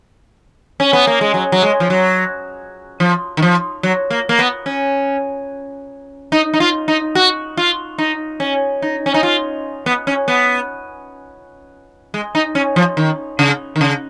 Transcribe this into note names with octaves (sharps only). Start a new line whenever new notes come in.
C#4
B3
A#3
G#3
F#3
F#3
G#3
F3
F#3
F3
D#3
F3
F#3
A#3
A#3
B3
C#4
D#4
D#4
F4
D#4
F#4
F4
D#4
C#4
D#4
C#4
D#4
F4
B3
C#4
B3
G#3
D#4
C#4
F3
D#3
C#3
D#3
C#3